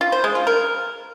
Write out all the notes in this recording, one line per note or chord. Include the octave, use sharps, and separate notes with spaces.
F4
C5
G#3
F4
A#4